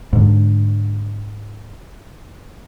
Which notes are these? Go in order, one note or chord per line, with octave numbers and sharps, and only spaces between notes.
G#2 D3